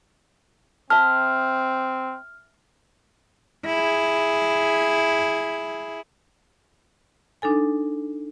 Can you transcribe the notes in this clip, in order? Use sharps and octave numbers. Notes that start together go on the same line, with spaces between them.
C4 E5 A5 F6
E4 G#4
D4 D#4 A4 G#5